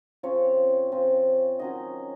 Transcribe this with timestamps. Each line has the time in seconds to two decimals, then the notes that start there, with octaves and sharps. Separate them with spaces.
0.23 C#3 F3 C4 C#5
0.92 C#3 F3 C4
1.59 D#3 F#3 C#4 D#5